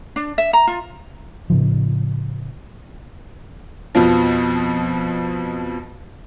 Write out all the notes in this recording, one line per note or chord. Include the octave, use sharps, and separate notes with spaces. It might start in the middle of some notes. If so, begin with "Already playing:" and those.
D4
E5
A#5
F4
A2 C#3 F3
F2 B2 F3